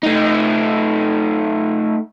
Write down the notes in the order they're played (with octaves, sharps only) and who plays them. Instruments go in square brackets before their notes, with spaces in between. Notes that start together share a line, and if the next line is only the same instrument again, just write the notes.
[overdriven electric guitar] A3 D#4